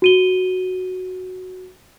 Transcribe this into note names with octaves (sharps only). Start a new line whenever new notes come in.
F#4 D#7 G7